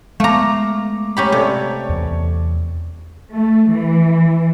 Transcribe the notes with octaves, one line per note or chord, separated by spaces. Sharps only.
G#3 A3 B3 F5 A#5 D6
C#4 G4 A#5 B5
C3 A4 C#5 D5
E2
A3
E3